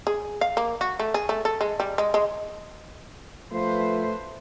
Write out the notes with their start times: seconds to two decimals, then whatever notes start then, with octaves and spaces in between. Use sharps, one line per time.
0.07 G#4
0.41 F5
0.57 A#3
0.81 F#4
1.00 A3
1.14 G#4
1.29 A3
1.45 A4
1.61 G#3
1.80 G3
1.98 G#3
2.14 G#3
3.52 F3 A3 B4 C5